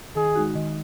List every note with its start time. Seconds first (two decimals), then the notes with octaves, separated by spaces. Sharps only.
0.16 D#3 G#4
0.35 G#3 D#4 F#4
0.55 D#3